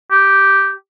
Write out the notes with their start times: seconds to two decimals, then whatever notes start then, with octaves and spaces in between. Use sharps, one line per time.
0.11 G4